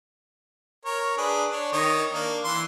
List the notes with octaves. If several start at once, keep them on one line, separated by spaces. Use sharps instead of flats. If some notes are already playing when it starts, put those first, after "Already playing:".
A#4 C#5
D4 G#4 B4
D4 C#5
D#3 C#5 D#5
A#3 D4
E3 C6